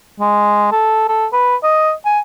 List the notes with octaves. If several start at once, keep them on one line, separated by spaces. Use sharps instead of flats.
G#3
A4
A4
B4
D#5
G#5